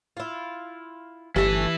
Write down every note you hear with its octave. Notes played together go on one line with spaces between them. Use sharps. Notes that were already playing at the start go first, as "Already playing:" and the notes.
E4 F4
G1 E3 A3 G4 A4 E5